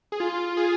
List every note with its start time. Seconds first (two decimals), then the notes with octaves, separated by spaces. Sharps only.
0.12 G#4
0.20 F4
0.57 G#4